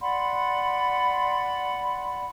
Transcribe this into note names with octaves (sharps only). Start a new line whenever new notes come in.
D5 F#5 B5 C6